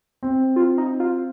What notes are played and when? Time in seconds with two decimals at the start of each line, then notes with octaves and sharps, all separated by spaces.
0.23 C4
0.56 F4
0.78 D#4
1.00 F4